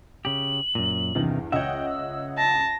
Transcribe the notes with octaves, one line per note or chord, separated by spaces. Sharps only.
C#3 G4 F#7
F#2 A#2
E2 G2 C3 D#3
C#2 C#5 D#5 E5 F#5 G5
E6
A5 A#6